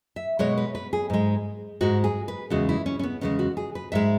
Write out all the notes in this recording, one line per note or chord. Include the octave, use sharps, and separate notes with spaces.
E5
B2 G#3 C#5
B4
B4
G#4
G#2 G#3
G#2 G#3 F#4
G#4
B4
E2 C#3 G#3 F#4
E4
C#4
C#4
B3
E2 C#3 G#3 C#4
F#4
G#4
B4
G#2 G#3 E5